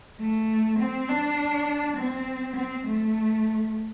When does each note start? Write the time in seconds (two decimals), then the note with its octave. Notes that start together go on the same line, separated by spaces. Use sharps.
0.20 A3
0.79 C4
1.09 D4
1.96 C4
2.56 C4
2.86 A3